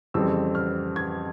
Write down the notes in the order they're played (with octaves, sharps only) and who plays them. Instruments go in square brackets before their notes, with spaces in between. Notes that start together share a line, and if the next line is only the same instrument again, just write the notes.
[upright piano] F2 C#3 E3 G3 C4 E6
F6
G#6